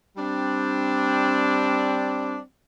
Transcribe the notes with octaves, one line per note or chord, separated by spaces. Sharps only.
G3 C4 D4